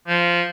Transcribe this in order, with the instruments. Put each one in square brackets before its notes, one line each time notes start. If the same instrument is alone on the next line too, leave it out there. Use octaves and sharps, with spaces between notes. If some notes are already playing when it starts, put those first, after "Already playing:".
[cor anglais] F3